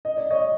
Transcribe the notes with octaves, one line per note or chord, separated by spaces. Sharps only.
D#5
D5
C#5 D#5